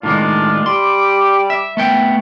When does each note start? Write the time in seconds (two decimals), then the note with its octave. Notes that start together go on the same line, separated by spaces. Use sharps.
0.03 A2 D#3 G#3 D4 F4
0.66 G3 C6 D6
1.50 E5
1.77 A3 B3 G5